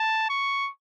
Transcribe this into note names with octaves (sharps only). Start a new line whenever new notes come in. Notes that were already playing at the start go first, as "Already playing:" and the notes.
Already playing: A5
C#6